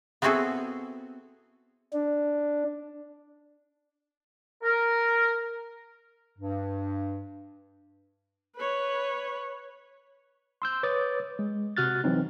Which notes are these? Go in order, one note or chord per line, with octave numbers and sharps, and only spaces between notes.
B3 C4 E4 F#4 G#4 A4
D4
A#4
G2
B4 C#5
C6 E6 G6
B4 C#5 D6 D#6 A6
G#3
C3 F#4 F6 F#6 A6
E3 F#3 C4 D#4